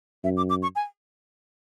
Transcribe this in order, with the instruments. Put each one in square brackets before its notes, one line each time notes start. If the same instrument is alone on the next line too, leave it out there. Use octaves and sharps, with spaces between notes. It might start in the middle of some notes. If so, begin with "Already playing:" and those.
[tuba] F#2 [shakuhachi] E5
[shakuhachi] D6
D6
C#6
G#5